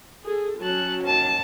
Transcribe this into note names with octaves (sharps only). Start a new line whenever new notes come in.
G#4 A4
F#3 C#4 A5 F#6
D#2 A5